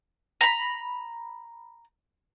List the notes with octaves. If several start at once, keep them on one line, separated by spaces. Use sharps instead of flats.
A#5 B5